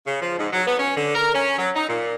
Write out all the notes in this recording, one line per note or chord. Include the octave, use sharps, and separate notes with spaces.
C#3
F3
G#2
F#3
B3
C#4
D3
A#4
C#4
F#3
D#4
A#2